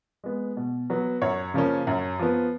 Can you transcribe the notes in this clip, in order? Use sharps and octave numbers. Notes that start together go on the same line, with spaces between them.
G#3 B3
B2
F#3 B3
F#2 C#5
C#3 F3 A#3 C#4
F#2
F3 B3